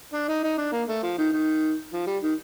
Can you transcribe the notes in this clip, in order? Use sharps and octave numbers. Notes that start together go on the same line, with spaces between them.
D4
D#4
D#4
D4
A#3
A3
F3
D#3
D#3
F3
G3
D#3